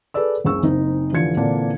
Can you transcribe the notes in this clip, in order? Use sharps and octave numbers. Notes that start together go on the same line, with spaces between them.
G#4 A4 B4 D5 E6
F#1 C#2 F#2 G#4 C#6 E6
F#1 C4 D#4
F1 D3 E3 F4 G#6 C#7
A#2 D3 E3 A#3 C4 D4